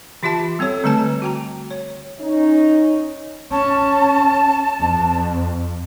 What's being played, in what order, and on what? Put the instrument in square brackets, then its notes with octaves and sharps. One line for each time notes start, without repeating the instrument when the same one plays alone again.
[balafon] E3 F4 G4 E5 A5
G3 C4 A4 C#5
D3 G3 A3 B4 G#5 A5
F#4 G5 A#5
C#5
[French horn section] C#4 D#4
[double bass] C#4 [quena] A5
[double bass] F2